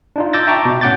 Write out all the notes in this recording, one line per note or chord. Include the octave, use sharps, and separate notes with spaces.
D4 D#4 F4
D6 E6 G6 A6 A#6
E5 G5 A5 A#5 C#6 D6
B2
A2 C#4 F#5 D6 G6 A6